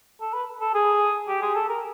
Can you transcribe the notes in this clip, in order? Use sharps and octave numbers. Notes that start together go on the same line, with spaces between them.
A4
B4
A4
G#4
G4
G#4
A4
A#4